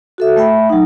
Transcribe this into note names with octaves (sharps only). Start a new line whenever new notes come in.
F#4 A4 E5
A3 E5 G5 B5
F#3 D#4